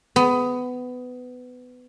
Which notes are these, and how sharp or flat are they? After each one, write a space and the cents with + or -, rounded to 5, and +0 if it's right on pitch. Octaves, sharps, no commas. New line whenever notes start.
B3 +20